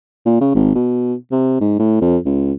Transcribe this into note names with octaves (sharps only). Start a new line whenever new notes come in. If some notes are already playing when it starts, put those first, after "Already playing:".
A#2
C#3
G#1
B2
C3
G#2
A2
F2
C#2